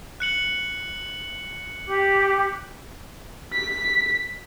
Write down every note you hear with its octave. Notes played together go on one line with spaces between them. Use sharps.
F#6 C#7 F#7
G4
B6